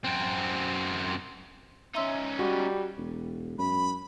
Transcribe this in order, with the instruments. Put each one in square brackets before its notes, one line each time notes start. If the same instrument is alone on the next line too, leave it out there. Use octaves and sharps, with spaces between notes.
[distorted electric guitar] F#2 C4
[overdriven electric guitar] C#4 D#4 [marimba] E5 C6 E6
[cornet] G3 [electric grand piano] F#4
[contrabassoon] E1
[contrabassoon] F#2 [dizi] B5